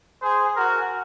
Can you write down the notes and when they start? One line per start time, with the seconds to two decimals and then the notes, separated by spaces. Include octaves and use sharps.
0.21 G#4 C5
0.55 F#4 A#4